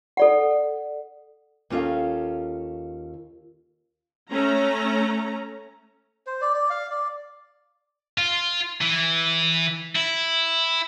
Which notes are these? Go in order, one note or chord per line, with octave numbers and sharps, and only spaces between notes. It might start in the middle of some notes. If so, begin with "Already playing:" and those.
A4 D5 F#5
D#2 C#4 F4 A4 F5
A3 C#4 A#5
C5
D5
D5
F5
D5
F4
E3
E4